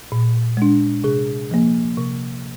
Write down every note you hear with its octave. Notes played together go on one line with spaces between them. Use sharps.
A#2
G#3 D4
C3 G#4
F3 A#3
C3